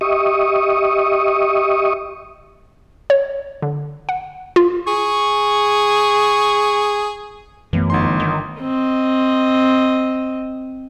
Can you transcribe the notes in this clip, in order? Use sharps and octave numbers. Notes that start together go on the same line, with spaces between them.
G4 D#5 E5 C#6 D#6
C#5
D3
F#5
F4
G#4 C#6
F#2 E3 A3 B3
G1 D#4 C6
D#3
C4 D#5